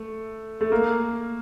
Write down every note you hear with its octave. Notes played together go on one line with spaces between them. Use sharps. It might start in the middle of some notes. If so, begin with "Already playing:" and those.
Already playing: A3
A3
A#3